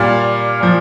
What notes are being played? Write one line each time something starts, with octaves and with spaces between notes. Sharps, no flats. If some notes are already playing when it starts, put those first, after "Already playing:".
Already playing: A#2 G3 D5 F5
A#2 F3